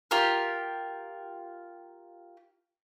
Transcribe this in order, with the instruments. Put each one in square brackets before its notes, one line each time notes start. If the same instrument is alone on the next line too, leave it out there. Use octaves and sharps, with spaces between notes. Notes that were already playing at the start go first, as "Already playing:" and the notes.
[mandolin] F4 G4 A#4